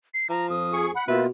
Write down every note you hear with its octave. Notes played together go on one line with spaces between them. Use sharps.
C7
F3 A#5
F2 D#6
G#4 C#6
F#5 B5
B2 A#3 F4 B4 E5